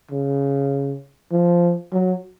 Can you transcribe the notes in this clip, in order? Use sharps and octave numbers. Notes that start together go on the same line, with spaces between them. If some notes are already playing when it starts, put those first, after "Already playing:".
C#3
F3
F#3